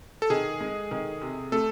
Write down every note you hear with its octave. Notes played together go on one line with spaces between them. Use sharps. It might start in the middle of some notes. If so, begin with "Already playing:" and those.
A4
D#3 G#4
G#3
D#3
C3
A3 A4